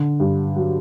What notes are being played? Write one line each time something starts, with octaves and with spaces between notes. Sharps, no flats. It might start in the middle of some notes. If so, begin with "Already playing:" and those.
Already playing: D3
G2
F#3